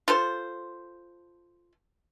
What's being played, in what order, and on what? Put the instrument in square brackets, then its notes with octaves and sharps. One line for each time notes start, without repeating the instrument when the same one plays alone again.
[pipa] F4 A4 C5